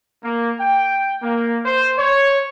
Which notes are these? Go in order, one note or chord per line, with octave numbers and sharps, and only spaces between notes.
A#3
G5
A#3
C5
C#5